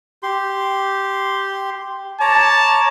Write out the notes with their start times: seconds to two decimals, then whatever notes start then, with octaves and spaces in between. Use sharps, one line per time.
0.23 G4 C6
2.21 C#5 A5 A#5 D6